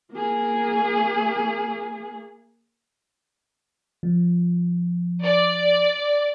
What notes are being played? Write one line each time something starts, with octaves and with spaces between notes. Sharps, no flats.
A#3 G#4
F3
D5